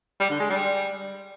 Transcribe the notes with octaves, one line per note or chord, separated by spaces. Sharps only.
G3
D3
G#3
G3